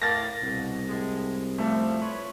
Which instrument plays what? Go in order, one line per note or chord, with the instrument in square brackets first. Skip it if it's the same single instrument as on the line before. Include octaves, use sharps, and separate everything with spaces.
[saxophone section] A2 A#3 [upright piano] A6 A#6
[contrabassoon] C2 [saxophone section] B2
[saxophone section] A2 G#3
[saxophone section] F#2 A#2 F3 [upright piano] A3
[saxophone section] F4 B4 C#5